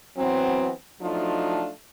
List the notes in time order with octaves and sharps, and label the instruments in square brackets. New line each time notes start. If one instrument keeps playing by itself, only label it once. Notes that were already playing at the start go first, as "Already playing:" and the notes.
[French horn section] E3 F#3 B3 C4
F3 F#3 A3 D4 D#4 F4